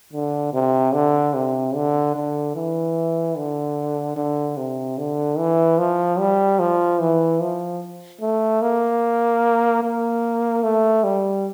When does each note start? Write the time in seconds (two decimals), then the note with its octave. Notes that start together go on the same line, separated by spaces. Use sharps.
0.13 D3
0.54 C3
0.94 D3
1.34 C3
1.75 D3
2.15 D3
2.56 E3
3.37 D3
4.17 D3
4.57 C3
4.98 D3
5.38 E3
5.78 F3
6.19 G3
6.59 F3
7.00 E3
7.40 F3
8.21 A3
8.62 A#3
9.83 A#3
10.64 A3
11.04 G3